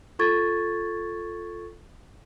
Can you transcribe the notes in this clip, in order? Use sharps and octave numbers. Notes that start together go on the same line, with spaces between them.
F4 A4 C#6 G#6 A6